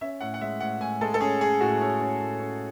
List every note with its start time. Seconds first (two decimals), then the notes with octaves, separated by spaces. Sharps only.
0.01 C#4 E5
0.20 A2 F#5
0.34 F#5
0.40 G#3 E5
0.60 A2 F#5
0.81 A2 G#5
1.01 G#3 A4
1.14 A4
1.20 C#4 G#4
1.41 C#4 G#4
1.60 A2 F#4
1.81 C#4
2.00 C#4
2.20 A2
2.40 C#4